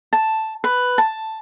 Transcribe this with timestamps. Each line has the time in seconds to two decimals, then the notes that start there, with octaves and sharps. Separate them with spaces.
0.13 A5
0.64 B4
0.98 A5